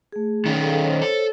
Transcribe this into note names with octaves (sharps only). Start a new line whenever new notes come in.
A3 G#4
D#3 C#4
G#4 A4 F5
C5 C#5
A4